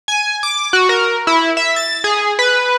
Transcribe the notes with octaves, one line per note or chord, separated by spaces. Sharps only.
G#5
D6
F#4
A#4
E4
E5
A6
G#4
B4